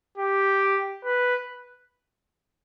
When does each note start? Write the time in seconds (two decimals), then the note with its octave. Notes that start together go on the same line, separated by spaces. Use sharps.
0.18 G4
1.04 B4